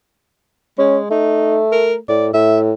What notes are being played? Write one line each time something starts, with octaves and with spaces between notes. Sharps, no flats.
G#3 C#4
A3 D#4
A#4
A2 D5
A2 E5